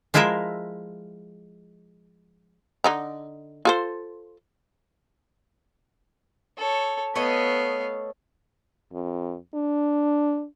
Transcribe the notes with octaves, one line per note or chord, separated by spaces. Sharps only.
F3 G#3 E4 F4 A#4 E5
D3 D#4 A#5
F4 A4 C5
A4 C#5
A3 B3 C#5 D#5 F5
F2
D4